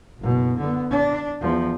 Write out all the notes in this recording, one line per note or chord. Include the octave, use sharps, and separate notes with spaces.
F#1 B2
D3 B3
D4
E2 F3